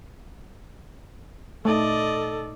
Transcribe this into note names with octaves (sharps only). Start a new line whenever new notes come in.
A#2 A3 D#4 A4 D5 D#5